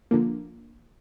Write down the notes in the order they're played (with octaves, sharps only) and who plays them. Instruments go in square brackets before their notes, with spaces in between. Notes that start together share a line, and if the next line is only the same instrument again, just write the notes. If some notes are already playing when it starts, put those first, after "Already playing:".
[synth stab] D3 F3 A#3